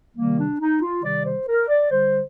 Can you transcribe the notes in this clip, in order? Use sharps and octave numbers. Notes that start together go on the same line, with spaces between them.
C3 D#3 G3 A#3
D4
D#4
F4
C3 D#3 G3 D5
C5
A#4
D5
D3 G3 C5